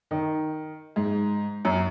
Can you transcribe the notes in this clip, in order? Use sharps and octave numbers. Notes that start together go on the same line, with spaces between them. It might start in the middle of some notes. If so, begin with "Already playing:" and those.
D#3
G#2
F#2